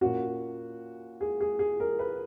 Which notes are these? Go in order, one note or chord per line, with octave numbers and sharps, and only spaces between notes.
A#2 A#3 C#4 F#4
G#4
G#4
G#4
A#4
B4